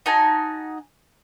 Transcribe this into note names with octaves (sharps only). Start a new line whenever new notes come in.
D#4 F#4 G#5 A5